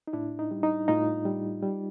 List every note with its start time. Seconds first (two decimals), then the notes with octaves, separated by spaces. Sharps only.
0.07 D#4
0.13 A2 D4 E4
0.39 D#4
0.51 G3
0.63 D#4
0.88 A2 D#4 F4
1.25 G3
1.62 G3